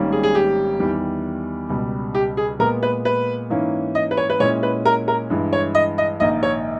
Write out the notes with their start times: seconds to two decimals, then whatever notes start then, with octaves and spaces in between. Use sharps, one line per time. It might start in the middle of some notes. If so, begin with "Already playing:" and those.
Already playing: G#1 G#2 G3 A#3 C#4
0.12 G#4
0.23 G#4
0.35 G4
0.80 E2 D#3 G3
1.69 C#2 B2 G3
2.15 G4
2.37 G#4
2.59 A#2 G#3 B3 A#4
2.83 B4
3.05 B4
3.50 G#2 E3 A#3 C#4
3.95 D#5
4.11 B4
4.17 C#5
4.30 B4
4.40 A#2 G#3 C#4 E4 C#5
4.63 B4
4.85 A#4
5.08 A#4
5.30 G2 E3 G#3
5.53 C#5
5.75 D#5
5.98 D#5
6.20 A#1 G#2 D#3 A#3 D#4 D#5
6.43 C#5